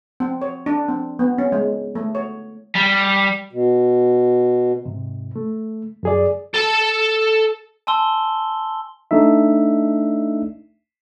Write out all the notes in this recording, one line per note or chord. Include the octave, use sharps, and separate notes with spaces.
C4
C#5
D4
C4
B3
C#4
G#3
A3
C#5
G3
B2
G#2 C3
A3
F#2 G#4 D5
A4 A5
G#5 A5 C6 E6 G7
A3 D4 D#4 E5